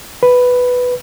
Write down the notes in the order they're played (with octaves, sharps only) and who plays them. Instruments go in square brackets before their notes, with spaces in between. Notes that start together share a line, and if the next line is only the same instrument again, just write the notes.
[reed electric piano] B4